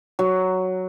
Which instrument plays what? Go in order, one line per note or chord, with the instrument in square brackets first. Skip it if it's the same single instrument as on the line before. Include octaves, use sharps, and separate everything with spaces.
[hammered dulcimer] F#3